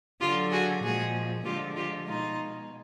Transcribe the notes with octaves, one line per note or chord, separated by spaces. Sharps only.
D3 F#3 F4 G4
F#4 G#4
A#2 F3 G#3 F#4 G#4
D3 F3 G#3 F4 G4
F4 G4
B2 G#3 D#4 F4